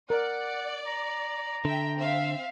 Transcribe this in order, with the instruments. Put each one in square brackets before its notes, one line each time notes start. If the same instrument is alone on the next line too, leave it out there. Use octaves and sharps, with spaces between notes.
[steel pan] A#4 [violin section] D5 [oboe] F#5
[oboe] A#5
[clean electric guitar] D3 [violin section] E5 G5
[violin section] C4 E5 F5